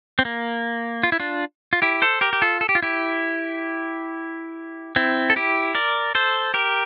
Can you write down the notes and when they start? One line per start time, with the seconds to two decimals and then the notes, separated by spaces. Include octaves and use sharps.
0.19 C4
0.25 A#3
1.03 F4
1.12 E4
1.20 D4 F4
1.73 F4
1.82 E4 G4
2.02 A4 C5
2.21 G4 A#4
2.33 G4
2.42 F4 A4
2.61 A4
2.69 G4
2.75 F4
2.83 E4 G4
4.96 C4 E4
5.30 A4
5.36 E4 G4
5.75 A#4 D5
6.15 A4 C5
6.54 G4 A#4